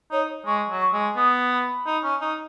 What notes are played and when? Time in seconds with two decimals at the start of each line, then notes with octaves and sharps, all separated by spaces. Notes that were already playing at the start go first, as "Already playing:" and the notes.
0.11 D#4 C#5
0.46 G#3 C#6
0.69 F#3
0.81 C#6
0.93 G#3
1.16 B3 D#6
1.51 B5
1.86 D#4
2.03 C#4
2.21 D#4